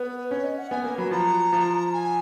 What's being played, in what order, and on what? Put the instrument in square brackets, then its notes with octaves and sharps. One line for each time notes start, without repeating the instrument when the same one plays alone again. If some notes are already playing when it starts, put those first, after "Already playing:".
Already playing: [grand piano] B3 [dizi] B4
[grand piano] C#4 [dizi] C#5
[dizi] D#5
F#5
[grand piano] B3 [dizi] G#5
[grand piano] A#3 [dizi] G#5
[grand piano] F#3 [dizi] B5
[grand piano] F3 [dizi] A#5
[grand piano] F3
[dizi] G#5